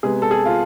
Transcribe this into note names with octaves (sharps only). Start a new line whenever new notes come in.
C3 G#3 B3 G#4
A4
G#4
F4